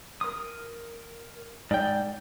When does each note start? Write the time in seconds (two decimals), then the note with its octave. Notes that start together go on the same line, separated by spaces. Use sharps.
0.21 A#4 D#6
1.71 G#2 D5 G5